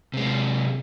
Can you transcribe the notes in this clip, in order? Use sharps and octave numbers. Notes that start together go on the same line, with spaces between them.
C3 G#3